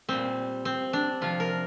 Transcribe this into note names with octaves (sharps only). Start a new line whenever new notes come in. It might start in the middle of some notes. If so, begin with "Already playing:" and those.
A#2 G3 C4
C4
D4
C3 F3 F4
A#4